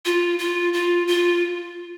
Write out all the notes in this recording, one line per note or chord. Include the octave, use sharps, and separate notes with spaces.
F4
F4
F4
F4